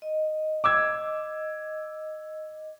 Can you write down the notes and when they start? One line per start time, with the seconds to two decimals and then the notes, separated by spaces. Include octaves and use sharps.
0.02 D#5
0.64 D6 E6 G#6